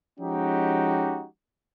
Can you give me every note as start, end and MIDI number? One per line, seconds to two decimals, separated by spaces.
0.20 1.26 53
0.20 1.26 56
0.20 1.26 61
0.20 1.26 63
0.20 1.26 66
0.20 1.26 67